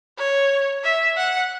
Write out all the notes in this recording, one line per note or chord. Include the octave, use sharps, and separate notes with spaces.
C#5
E5
F#5